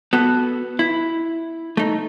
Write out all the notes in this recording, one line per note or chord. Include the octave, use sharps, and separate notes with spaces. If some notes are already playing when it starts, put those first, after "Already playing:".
B3 F#4 A4
E4
A3 D#4